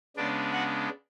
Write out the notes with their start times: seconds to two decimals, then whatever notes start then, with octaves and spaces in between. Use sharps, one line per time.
0.16 C#3 G#3 B3 D4 D5
0.53 F#4 F#5